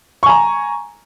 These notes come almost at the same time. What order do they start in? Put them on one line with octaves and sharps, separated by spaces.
C#6 G#5 A#5